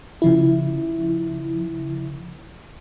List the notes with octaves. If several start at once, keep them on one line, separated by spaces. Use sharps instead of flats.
C#3 F3 E4